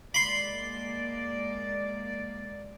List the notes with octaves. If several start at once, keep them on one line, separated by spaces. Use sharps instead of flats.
G#3 A#3 D5 B5 C6